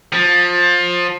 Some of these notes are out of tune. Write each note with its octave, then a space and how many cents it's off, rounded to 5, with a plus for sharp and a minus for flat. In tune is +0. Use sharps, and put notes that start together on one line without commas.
F3 +20